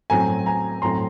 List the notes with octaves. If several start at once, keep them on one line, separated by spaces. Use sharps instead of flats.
A2 F#3 A3 C4 G#5 A#5
G#5 A#5
A2 F#3 A3 C4 A#5 C6